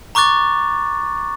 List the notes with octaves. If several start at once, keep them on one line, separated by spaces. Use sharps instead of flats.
A#5 C#6 D6 F#6 A6